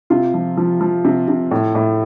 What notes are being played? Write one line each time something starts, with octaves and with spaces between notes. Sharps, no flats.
C3 F4
F3
F3
F3
C3
C3
A2
A2